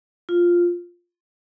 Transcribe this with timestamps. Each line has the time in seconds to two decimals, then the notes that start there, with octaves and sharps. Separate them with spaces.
0.29 F4